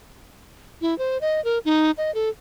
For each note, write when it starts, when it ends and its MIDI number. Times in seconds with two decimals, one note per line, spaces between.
0.81 0.97 64
0.98 1.18 72
1.21 1.43 75
1.45 1.59 70
1.65 1.91 63
1.98 2.13 75
2.15 2.30 69